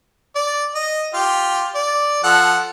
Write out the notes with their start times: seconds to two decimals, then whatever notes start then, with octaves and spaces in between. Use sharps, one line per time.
0.35 D5
0.75 D#5
1.14 F4 G4
1.75 D5
2.24 F3 A4 F#5